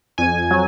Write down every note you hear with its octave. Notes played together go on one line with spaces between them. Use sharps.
F2 G#5
F#3